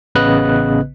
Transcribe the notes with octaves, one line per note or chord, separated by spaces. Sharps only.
A1 C#3 B3 B4 D#5 F#6